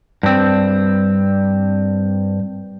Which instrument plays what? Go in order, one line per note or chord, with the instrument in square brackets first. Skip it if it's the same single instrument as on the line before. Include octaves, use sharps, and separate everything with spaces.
[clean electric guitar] G2 C4